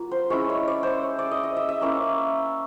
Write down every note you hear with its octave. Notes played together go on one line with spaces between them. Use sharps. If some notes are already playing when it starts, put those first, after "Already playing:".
Already playing: F#3 A#3 F4
C5
G#3 C#4 E4 C#5
C#5
D5
C5 C#5
D5
D#5
D#5
E5
E5
A#3 C#4 E4